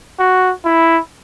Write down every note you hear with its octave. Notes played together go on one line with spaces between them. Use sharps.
F#4
E4